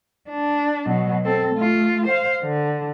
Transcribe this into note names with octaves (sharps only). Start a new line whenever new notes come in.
D4
B2 F#3
C4 A4
A3 F4
C5 F5
D3